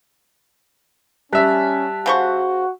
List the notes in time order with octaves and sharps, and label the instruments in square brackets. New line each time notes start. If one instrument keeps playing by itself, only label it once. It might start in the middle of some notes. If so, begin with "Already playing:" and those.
[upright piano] G3 E5 [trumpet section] C#4 [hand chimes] A5 F#6 B6
[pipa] C#3 C5 C#6 [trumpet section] F#4